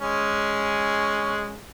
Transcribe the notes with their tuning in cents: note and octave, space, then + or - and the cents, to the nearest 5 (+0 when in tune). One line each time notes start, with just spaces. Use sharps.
G#3 +0 C#4 +0